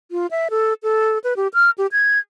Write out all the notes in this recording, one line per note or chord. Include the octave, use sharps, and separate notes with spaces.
F4
E5
A4
A4
B4
G4
F6
G4
G#6